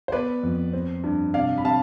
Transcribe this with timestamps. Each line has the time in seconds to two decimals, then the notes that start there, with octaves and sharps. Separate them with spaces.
0.08 C5
0.12 B3 B4 D5
0.43 F2
0.73 C4
1.04 G2
1.34 C3 D5 F5
1.58 B5
1.64 C3 F5 A5